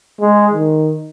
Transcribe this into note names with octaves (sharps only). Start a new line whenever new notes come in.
G#3
D#3